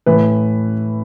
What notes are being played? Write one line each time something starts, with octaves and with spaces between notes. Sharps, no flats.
A2 E3 B4